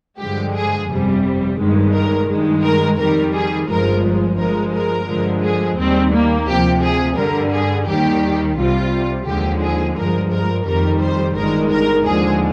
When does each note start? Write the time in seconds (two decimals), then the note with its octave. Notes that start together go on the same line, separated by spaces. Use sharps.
0.19 G2 D3 F3 G#3 G4
0.54 G#4
0.89 G1 F2 C3 G3
1.59 G1 G2 D#3 G#3
1.94 A#4
2.29 G2 D#3 G#3
2.64 A#4
2.99 F2 D#3 G3 A#4
3.34 G#4
3.68 G1 G2 F3 G#3 A#4
4.38 G2 F3 G#3 A#4
4.73 A#4
5.08 G2 D3 F3 G#3
5.43 G#4
5.78 D#2 D#3 G3 C4
6.13 A#3
6.47 D2 C3 F3 G4
6.83 G#4
7.17 G2 D3 G3 A#4
7.52 G#4
7.87 D#2 D#3 G3 G4
8.57 C2 C3 G3 F4
9.26 D#2 D3 F3 G#3 G4
9.62 G#4
9.97 G2 F3 G#3 A#4
10.32 A#4
10.66 F2 D#3 G3 A#4
11.01 C5
11.36 G1 G2 D#3 G#3 A#4
11.71 A#4
12.06 D#2 D3 F3 G#3 G#4